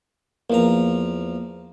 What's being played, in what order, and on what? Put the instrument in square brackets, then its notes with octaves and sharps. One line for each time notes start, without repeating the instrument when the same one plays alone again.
[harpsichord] E2 F3 A#5 [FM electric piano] A#3